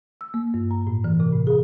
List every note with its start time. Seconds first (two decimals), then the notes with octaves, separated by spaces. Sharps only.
0.21 E6
0.34 A#3
0.54 G2
0.71 A#5
0.87 A2
1.04 E3
1.20 C3
1.33 A2
1.47 G#4